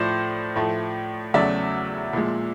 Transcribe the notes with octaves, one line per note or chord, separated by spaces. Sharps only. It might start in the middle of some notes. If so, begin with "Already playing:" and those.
Already playing: A2 F3 A3 C5 D5
A2 F3 A3
E2 C#3 F#3 A3 D5 E5
A#2 F3 G#3